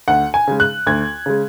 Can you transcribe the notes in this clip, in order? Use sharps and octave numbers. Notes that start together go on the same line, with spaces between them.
D2 F#5
G#5
C#3 G#3
F#6
D2 G#6
C#3 G#3